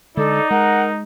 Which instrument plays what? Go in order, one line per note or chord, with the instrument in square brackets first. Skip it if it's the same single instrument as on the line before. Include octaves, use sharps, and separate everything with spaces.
[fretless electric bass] D3 G#3 [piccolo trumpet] D#4 [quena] A4 [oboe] D5
[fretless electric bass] G#3 [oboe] A#4 [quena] F#5